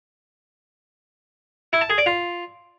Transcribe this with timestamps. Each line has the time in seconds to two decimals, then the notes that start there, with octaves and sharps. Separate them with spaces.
1.73 E4
1.81 A5
1.90 G#4
1.98 D5
2.06 F4